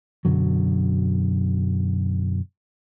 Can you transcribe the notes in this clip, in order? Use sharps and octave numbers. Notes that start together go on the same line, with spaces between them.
F#2 B2 D3 F#3